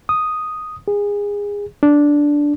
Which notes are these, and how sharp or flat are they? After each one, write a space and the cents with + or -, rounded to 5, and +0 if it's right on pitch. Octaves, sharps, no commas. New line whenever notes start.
D#6 +0
G#4 -25
D4 -5